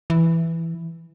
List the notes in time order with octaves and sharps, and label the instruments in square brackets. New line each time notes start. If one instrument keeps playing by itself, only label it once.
[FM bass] E3